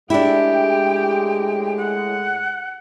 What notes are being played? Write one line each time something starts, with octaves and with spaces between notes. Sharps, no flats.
A2 G#3 D4 E4 G4 G5
F#5